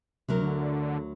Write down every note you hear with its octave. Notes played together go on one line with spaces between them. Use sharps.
D2 C3 F#3 A#4
D3